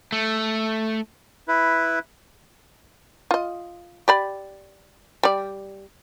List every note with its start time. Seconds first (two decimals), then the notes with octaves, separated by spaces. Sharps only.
0.12 A3
1.48 E4 B4
3.31 F4 D#5
4.08 G4 D5 B5
5.23 G3 D5